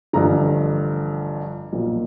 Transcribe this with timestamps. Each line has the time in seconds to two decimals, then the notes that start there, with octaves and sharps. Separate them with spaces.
0.13 A1 G2 D3 F3 A#5
1.72 B1 A#2 F3